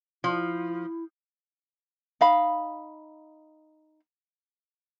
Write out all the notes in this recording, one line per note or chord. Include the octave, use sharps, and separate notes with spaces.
F3 E4
D#4 F5 B5